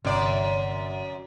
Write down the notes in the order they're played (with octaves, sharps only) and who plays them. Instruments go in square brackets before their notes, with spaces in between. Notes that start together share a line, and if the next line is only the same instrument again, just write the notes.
[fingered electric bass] G1 C3 [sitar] F#2 D5